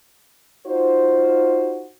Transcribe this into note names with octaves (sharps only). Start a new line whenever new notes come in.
D#4 F4 F#4 C5